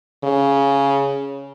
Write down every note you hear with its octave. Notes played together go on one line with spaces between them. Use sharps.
C#3